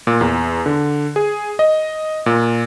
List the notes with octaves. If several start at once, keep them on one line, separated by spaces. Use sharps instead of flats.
A#2
E2
D3
G#4
D#5
A#2